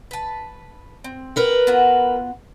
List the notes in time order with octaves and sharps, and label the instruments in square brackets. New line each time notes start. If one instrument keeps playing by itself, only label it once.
[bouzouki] B4 A5
C4
[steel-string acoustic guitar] A#4 B4 F#5
[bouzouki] B3 F4 F#4